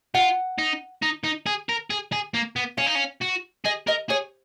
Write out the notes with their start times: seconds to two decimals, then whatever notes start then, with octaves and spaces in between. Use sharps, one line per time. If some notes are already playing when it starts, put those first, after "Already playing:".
0.14 F4 F#5
0.58 D#4
1.03 D#4
1.24 D#4
1.46 G#4
1.69 A#4
1.90 G#4
2.12 G#4
2.34 A#3
2.56 B3
2.77 C#4 F5
2.87 D#4
2.95 C#4
3.22 F#4
3.65 G#4 D#5
3.87 A#4 D#5
4.10 G#4 C#5